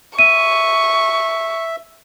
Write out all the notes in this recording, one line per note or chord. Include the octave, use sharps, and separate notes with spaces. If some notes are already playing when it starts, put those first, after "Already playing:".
E5 C#6 D#7